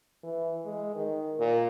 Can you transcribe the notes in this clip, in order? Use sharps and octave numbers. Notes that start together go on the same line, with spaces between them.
E3
G#3
D#3
A#2